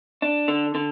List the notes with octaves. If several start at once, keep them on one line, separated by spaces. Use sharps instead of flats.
D4
D3
D3